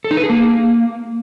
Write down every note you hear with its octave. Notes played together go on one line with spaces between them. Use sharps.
A4
D#4
B4
G#4
A#3